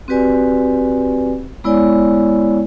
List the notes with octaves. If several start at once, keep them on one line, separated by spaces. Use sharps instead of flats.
C4 F#4 G4 B4 D5 G#5
G#3 B3 E4 C#5 D5 G#5